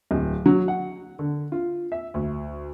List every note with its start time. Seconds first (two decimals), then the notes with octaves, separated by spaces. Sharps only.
0.11 D1
0.46 F#3
0.68 F#5
1.19 D3
1.52 F4
1.92 E5
2.14 D2